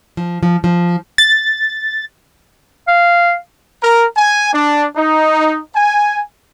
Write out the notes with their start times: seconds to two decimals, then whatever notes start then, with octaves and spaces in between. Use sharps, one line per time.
0.17 F3
0.43 F3
0.64 F3
1.18 A6
2.88 F5
3.82 A#4
4.16 G#5
4.53 D4
4.96 D#4
5.75 G#5